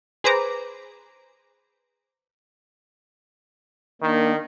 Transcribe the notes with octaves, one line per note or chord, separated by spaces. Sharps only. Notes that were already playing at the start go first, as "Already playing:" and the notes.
G#4 B4 C5 A#5 D6
D#3 A#3 D4